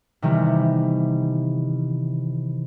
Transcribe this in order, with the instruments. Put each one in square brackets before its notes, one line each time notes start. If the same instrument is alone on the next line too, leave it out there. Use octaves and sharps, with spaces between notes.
[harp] C3 D#3 E3 G3 B3